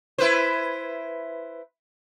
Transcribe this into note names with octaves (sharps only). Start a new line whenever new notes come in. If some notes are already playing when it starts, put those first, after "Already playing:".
E4 B4 C5